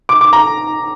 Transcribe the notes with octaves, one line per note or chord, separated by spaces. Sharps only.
D6
D6
A#5